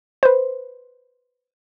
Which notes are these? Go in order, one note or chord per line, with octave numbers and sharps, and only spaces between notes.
B4 C5